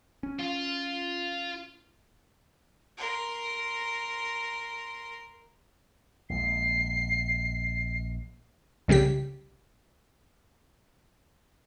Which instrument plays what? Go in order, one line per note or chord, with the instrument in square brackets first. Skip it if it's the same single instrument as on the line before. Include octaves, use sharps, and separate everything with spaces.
[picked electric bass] C#4
[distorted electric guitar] F4
[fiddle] A#4 C6
[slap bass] A#1 G#3 [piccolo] C7
[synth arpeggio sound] C2 C#3 G3 G4 B6